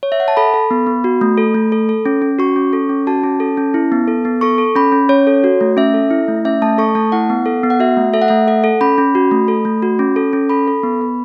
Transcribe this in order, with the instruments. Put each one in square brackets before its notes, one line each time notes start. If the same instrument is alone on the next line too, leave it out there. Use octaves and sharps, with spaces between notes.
[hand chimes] C#5
E5
F#5
A5
A4 B5
A4
B3
B3
F#4
A3
A4
A3
A4
A4
C#4
C#4
F#4 C#6
C#4
A4
C#4
F#4 A5
C#4
A4
C#4
E4
B3
A4
B3
A4 C#6
A4
C#4 B5
C#4
C#4 C#5
A4
F#4
A3
C#4 E5
A4
E4
A3
C#4 E5
A3 A5
A4 C#6
A3 A5
E4 F#5
B3
A4
B3
F#5
F#4 E5
A3
A4 E5
F#5
A3 E5
A4 F#5
A4
C#4 B5
C#4
F#4
A3
A4
A3
F#4
C#4
A4
C#4
A4 B5
A4
B3
B3